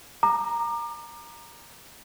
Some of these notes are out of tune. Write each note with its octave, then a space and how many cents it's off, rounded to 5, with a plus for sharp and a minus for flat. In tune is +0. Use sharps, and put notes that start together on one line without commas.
A#5 +0 D6 +35